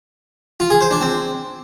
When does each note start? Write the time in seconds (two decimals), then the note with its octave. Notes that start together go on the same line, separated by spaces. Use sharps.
0.60 F4
0.70 G#4
0.81 C5
0.91 D4
1.01 C4